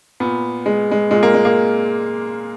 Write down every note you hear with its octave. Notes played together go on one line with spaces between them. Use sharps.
A#2 B3
G#3
G#3
A#2 G#3
A#3
G#3
A#3